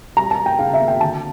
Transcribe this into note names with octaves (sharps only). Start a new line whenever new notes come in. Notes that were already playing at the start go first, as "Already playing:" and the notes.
G3 A#5
A5
G3
G5
C#3 F5
E5
A#3
G5
D3 A5